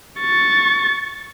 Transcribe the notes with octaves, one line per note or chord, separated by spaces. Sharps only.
C#6 A6